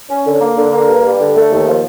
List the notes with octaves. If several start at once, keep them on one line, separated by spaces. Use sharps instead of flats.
C#4
D3
A#3
D3
A#3
G2
G3
D3
A3
D#2
F3